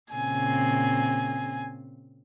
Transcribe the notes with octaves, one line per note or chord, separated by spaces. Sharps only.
A#2 C#3 C4 G#5